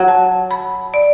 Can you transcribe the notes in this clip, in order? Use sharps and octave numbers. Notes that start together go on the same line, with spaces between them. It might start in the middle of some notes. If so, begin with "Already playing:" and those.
Already playing: F#3
A5
B5
D5